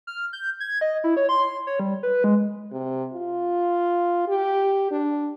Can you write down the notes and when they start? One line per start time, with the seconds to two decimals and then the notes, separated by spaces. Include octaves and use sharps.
0.07 F6
0.33 G6
0.60 G#6
0.81 D#5
1.04 E4
1.17 C#5
1.29 C6
1.67 C#5
1.80 G3
2.03 B4
2.24 G#3
2.72 C3
3.13 F4
4.28 G4
4.91 D4